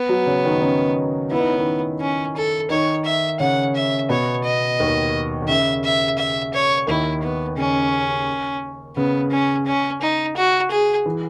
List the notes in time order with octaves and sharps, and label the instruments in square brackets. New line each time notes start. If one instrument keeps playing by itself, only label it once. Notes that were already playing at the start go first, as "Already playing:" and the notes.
Already playing: [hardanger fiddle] B3
[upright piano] F#3 F#4
C#3 C#4
D#3 D#4
C#3 C#4
[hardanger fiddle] B3 [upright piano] E4
[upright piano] D#4
C#4
D#3 D#4
[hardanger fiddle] C#4
A4
[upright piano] D#3 D#4 [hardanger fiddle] C#5
[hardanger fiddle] E5
[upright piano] C#3 C#4 [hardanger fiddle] F#5
[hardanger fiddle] E5
[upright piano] B2 B3 [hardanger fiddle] C#5
[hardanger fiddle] D#5
[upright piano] D#2 D#3
D#3
[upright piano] C#3 [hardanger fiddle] E5
[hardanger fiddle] E5
E5
C#5
[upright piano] D#2 D#3 [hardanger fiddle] E4
[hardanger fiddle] B3
[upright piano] C#3 [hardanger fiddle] C#4
[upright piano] C#3 [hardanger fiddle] B3
[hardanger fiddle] C#4
C#4
D#4
F#4
G#4
[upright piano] E3